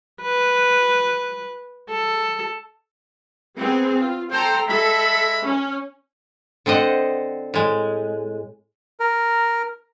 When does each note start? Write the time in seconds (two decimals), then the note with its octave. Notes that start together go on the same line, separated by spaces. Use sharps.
0.21 B4
1.90 A4
3.59 B3 C4 G#4
3.99 F4
4.31 A4 C5 G5 A#5
4.68 G#3 A4 E5 B5
5.43 C#4
6.66 D3 C4 C5 D#5 F#5
7.54 A2 G#3
9.00 A#4